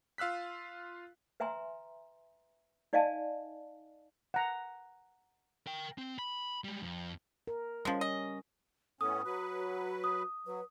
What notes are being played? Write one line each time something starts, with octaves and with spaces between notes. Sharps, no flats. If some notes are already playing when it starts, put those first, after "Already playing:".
F4 F5 E6 F#6 B6
B4 E5 G#5 A#5 C6
D#4 D5 D#5 F5 G#5 A5
F#5 A#5
A#4 G5
C4
B5
G3 G#3
F2
A#4
F3 G3 G#3 C#4
D#5
A2 B3 C#4 A4 D#6
F#3 F#4 B4
D#6
F#3 B4